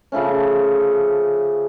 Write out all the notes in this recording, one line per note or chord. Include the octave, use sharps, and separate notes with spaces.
C#3 F3 A3 C#4